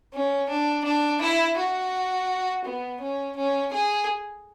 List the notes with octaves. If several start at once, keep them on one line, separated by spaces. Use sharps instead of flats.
C#4
D4
D4
E4
F#4
B3
C#4
C#4
G#4